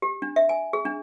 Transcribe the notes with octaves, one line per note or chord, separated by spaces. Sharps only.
G4
D4
E5
G#5
G#4
D4